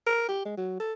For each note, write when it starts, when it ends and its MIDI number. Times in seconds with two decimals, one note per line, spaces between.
0.07 0.25 70
0.28 0.44 67
0.45 0.55 56
0.57 0.75 54
0.80 0.93 69